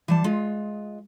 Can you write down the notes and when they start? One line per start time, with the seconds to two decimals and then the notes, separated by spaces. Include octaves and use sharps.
0.08 E3 G3 A5
0.24 G#3 F4